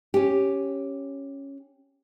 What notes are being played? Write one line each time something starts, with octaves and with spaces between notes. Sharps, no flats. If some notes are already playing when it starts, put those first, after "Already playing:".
C#4 G4